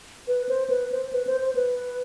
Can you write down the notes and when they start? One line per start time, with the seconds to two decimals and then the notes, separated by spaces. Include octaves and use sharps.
0.28 B4
0.49 C5
0.70 B4
0.92 C5
1.13 B4
1.27 C5
1.41 C5
1.55 B4